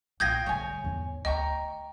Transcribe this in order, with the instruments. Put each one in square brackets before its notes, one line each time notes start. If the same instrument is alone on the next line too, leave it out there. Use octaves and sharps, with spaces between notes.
[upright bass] B1 A#2 [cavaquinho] F4 G5 D#6 [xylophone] G6 G#6 A#6
[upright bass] D3 G3 [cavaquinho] C#5 G#5
[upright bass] E2 G#2
[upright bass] D2 [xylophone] D#5 [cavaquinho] G5 A#5 C#6